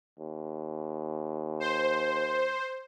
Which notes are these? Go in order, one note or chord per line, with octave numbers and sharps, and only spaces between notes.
D#2
C5